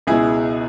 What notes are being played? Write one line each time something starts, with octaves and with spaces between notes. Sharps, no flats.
C#2 B2 E4 G#4